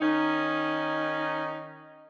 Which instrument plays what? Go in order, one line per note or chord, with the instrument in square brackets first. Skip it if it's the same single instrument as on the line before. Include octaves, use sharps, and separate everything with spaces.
[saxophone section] D#3 C#4 D#4